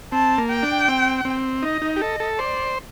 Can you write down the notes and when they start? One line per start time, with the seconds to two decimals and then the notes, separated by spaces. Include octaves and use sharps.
0.12 C4 A5
0.38 A#3
0.50 G5
0.63 D4
0.88 C4
1.25 C4
1.63 D#4 D#5
1.82 D#4
1.96 G4
2.01 A4 D#5
2.20 A4
2.38 C5 D5